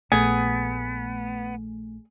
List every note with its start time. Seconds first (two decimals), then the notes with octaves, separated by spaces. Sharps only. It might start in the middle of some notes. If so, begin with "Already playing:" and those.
0.12 A#1 A3 B3 G#4